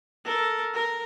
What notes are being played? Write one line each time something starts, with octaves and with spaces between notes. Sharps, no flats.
A4 A#4
A#4